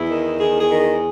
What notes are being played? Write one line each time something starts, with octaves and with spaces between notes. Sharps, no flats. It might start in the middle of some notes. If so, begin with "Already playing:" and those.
Already playing: E2 E4
D#3
E2 G#4
G#4
D#3
G#4